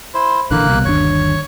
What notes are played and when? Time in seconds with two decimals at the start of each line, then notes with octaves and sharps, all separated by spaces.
0.14 E4 C5
0.51 A#1 D3 E3 A#3 F#6
0.67 C2 B2
0.85 G1 D#2 D4 C#5